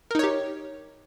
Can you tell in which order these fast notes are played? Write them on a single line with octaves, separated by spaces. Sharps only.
A#4 D#4 C#5 G4